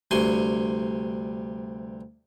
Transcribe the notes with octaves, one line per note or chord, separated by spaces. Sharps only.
D2 G2 C3 G#5 C6 C#6